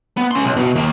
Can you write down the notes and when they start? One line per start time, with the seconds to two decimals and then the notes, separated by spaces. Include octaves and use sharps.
0.17 B3
0.31 C#4 C6
0.45 B1
0.57 B2
0.76 D#3 A#3